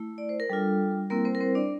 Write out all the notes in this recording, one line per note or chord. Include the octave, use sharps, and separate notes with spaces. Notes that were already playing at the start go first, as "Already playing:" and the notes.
Already playing: A3 E4
D5
C5
A#4
G3 D4 F4 A4
G3 A#3 C4 E4 A#4
C4 C5
A#4
C4 C5
D4 D5